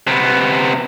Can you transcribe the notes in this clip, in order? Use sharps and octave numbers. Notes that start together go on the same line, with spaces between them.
C3 B3